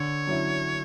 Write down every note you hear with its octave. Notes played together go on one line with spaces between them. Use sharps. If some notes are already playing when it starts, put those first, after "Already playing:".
Already playing: D3 C#5
F#3 C#4 E4